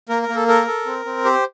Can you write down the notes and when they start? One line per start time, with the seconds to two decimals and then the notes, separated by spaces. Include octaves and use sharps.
0.09 A#3 A#4
0.22 A#4
0.29 A#3
0.35 A4
0.48 A4 A#4
0.67 A4
0.86 C4
1.05 C4
1.24 G4 C5